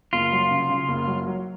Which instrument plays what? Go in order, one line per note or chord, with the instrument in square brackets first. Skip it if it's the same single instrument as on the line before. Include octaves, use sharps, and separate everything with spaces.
[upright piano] F#1 [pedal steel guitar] F4
[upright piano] F#3
C#3
C#3
F#1
F#3
F#3